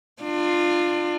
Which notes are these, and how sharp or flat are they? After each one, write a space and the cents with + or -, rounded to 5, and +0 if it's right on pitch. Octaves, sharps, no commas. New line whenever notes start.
D4 +30 F4 +0